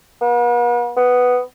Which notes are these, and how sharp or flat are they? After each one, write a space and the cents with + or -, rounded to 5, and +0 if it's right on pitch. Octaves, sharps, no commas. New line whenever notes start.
B3 -45
B3 +5